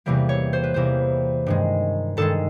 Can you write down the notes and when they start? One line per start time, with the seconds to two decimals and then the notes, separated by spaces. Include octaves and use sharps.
0.06 E2 C3 E3 G3 A#3
0.29 C#5
0.53 C5
0.64 B4
0.74 E2 C3 E3 G3 A#3 C5
1.47 G2 D#3 G#3
2.17 G2 D#3 G#3 A4